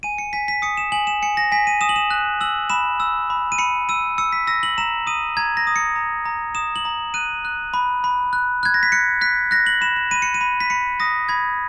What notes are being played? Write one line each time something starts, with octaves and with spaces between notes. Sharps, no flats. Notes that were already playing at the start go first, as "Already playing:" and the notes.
G#5 D#7
C#7
G#5 B6
B6
D#6 C#7
E7
G#5 F#7
E7
G#5 C#7
A#6
G#5 B6
D#7
D#6 E7
F#7
E7
F#6
E6 F#7
B5 E7
E6
B5
D#7
B5 C#7
E6 D#7
E6 C#7
B6
E6 A#6
F#7
A#5 E7
D#6 D#7
A#5 G#6
A#6
D#6
C#7
A#5
A#5
D#6 E7
F#7
A#5
F#6 D#7
F#6
B5
B5
F#6
F#6 G#6
A#6
B6
F#6 C#7
F#6 B6
F#6 A#6
F#7
B5 E7
E7
B5 D#7
C#7
D#7
B5
B6
B5 C#7
D#6 A#6
B5 G#6